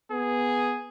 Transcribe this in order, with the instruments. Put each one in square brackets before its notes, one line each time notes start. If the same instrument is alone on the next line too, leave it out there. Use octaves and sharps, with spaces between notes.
[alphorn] B3 [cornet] G#4